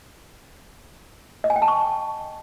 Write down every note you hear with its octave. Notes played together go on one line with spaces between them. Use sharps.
D#5
G#5
G5
A5
C#6